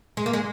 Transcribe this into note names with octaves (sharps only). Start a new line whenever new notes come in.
G#3
A#3
G#3